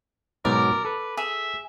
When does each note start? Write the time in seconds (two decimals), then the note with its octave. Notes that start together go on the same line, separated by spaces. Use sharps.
0.45 G#2 B2 F#3 A#4 D5
0.85 A4 B4
1.17 G#4 E5